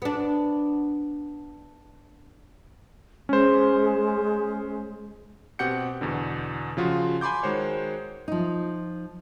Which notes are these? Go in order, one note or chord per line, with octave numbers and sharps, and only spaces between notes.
B3 D4
G#3 C#4 C5
B2 C4 G4 F#5 G6 C#7
E2 B2 D3
C#3 F3 F4 F#4
G#5 B5 C6 D6 G6
D#3 G#3 F#4 C5 C#5
F3 D#4